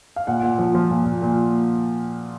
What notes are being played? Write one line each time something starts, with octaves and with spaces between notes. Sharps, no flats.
F5
A#2 F#5
A#2
F3
F3
A#2
A#2
A#2